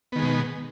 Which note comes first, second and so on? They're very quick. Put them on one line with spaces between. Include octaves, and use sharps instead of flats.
B3 D#3 G#3 B2